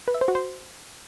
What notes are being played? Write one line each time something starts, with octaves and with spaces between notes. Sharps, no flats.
B4
E5
C5
F#4
C5